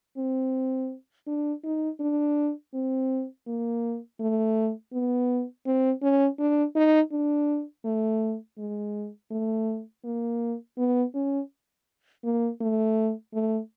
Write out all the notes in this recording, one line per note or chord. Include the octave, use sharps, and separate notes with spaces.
C4
D4
D#4
D4
C4
A#3
A3
B3
C4
C#4
D4
D#4
D4
A3
G#3
A3
A#3
B3
C#4
A#3
A3
A3